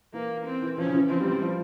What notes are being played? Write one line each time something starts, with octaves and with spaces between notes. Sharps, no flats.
E3 A#3
C4
E3
F3 C#4
C#3
E3
F3 C4
G3
G3
F3